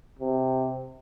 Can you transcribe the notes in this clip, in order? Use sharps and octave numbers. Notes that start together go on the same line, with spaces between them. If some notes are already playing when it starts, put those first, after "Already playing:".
C3